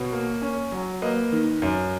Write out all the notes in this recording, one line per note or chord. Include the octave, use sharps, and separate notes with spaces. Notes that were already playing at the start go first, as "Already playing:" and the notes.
Already playing: B2 C#5
A#3
C#4
F#3
A#3 B4 D#5
D#3
F#2